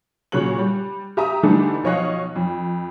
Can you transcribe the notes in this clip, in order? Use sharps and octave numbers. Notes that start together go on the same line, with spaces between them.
A#2 C#3 F#3 C#5 F#6 F#7
G3
G4 E5 A#5 D#6
D3 E3 G3 A3 D4 D#4
B1 F3 C#5 D#5 F5 F#6
F2